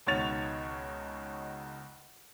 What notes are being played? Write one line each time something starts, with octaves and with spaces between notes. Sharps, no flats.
C#2 B2 D#3 C#5 A6 F7